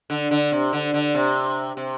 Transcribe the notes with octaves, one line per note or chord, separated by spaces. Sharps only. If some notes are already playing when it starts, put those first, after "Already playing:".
D3
D3
C3
D3
D3
C3
C3